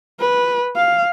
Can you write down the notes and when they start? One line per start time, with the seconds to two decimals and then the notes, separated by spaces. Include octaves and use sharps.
0.20 B4
0.77 F5